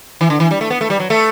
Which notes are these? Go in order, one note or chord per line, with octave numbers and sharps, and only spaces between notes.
E3
D3
E3
G3
A3
B3
A3
G3
F#3
A3